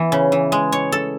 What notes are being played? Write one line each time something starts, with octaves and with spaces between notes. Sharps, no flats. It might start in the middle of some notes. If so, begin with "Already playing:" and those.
Already playing: E3 B3
C#3
E3
G#3
C#5
A4